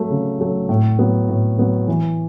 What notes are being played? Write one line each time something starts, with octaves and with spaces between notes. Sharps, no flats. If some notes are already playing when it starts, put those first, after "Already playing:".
Already playing: F#3 A3
C#3
F#3 A3
A2
F#3 B3
A2
F#3 B3
E3